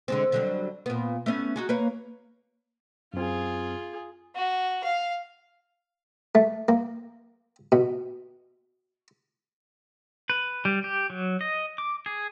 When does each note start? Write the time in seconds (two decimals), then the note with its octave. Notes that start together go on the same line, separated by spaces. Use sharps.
0.08 D3 G#3 C4
0.32 D3 F#3 G3
0.86 A#2 B3
1.26 A3 B3 C#4
1.56 D#4 F#4 G#4
1.69 A#3 B4 C#5
3.14 F#2 C4 F4 G#4
4.36 F#4
4.84 F5
6.35 A3
6.68 A#3
7.72 B2
10.30 B4
10.65 G3
10.84 G4
11.10 F#3
11.41 D#5
11.78 D6
12.06 G#4